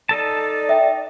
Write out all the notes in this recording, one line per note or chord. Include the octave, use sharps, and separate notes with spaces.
D#4 A4 D5 A5
E5 G5